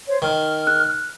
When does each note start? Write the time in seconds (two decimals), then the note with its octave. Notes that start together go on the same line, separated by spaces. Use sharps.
0.07 C5 C#5
0.22 D#3 F6
0.67 F#6